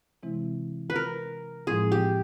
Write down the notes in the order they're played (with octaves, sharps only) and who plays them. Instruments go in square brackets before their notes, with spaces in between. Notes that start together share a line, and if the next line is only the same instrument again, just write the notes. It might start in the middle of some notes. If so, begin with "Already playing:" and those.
[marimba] C3 E3 G#3 C4 E4
[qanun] B4
A#4
[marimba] A2 F3 G#3 C4 E4 [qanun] G#4
[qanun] G4